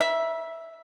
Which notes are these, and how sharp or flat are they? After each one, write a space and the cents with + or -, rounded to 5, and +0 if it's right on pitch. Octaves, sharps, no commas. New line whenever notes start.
E5 +0 B5 -45